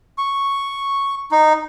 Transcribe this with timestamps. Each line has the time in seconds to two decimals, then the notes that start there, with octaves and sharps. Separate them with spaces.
0.18 C#6
1.31 D#4